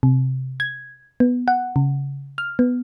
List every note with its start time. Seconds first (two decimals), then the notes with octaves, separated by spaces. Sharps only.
0.03 C3
0.60 G#6
1.20 B3
1.48 F#5
1.76 C#3
2.38 F6
2.59 B3